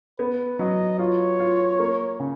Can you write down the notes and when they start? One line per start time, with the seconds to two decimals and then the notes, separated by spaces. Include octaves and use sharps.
0.19 B3 B4
0.59 F#3 D#5
0.99 F4 C#5
1.39 F4
1.79 A#3
2.20 C#3